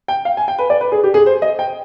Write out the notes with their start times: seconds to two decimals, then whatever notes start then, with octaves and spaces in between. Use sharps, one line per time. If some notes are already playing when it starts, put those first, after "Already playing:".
0.08 G5
0.25 F5
0.37 G#5
0.48 G5
0.59 B4
0.70 D5
0.81 B4
0.92 G#4
1.04 G4
1.14 G#4
1.26 C5
1.42 D#5
1.59 G5